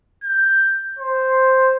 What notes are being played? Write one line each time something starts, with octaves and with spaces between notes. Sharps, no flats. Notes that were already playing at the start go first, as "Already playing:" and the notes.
G6
C5